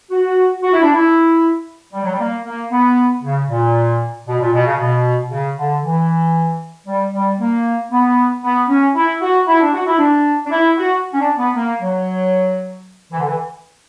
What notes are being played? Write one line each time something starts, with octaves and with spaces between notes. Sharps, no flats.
F#4
F#4
E4
D4
E4
G3
F#3
G3
A#3
A#3
B3
C#3
A#2
B2
A#2
B2
C#3
B2
C#3
D3
E3
G3
G3
A#3
B3
B3
C#4
E4
F#4
E4
D4
F#4
E4
D4
D4
E4
F#4
C#4
D4
B3
A#3
F#3
E3
D3
E3